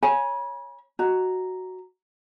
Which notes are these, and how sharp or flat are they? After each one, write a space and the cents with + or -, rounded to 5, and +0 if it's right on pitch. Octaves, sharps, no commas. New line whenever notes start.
C#5 +0 G#5 +0 B5 -40
F#4 +0 D#5 +0 A#5 +0